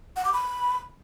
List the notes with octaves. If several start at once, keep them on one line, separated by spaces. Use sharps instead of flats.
F#5
D6
B5